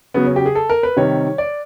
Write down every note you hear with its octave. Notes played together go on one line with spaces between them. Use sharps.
C#3 F#3 B3
C#4
G4
G#4
A4
A#4
B4
C3 D#3 G3 C#5
D5